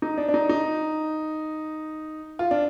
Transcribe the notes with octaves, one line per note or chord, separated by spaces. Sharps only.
D#4
D4
D4
D#4
D#4
F4
D4